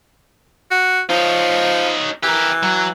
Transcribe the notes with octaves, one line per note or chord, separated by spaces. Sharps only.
F#4
F3 D#4 C#5
E3 G4 A#4
F#3